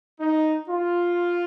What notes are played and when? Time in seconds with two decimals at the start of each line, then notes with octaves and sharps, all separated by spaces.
0.19 D#4
0.69 F4